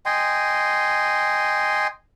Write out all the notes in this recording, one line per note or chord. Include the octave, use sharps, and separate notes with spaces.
D#5 G5 G#5 C6